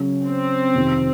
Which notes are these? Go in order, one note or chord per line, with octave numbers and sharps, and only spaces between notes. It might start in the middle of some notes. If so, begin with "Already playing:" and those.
Already playing: C#3 F#3 C#4
C4
F2 C3 D#3